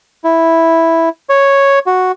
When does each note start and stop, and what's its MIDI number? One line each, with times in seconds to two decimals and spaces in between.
0.24 1.09 64
1.29 1.79 73
1.86 2.12 66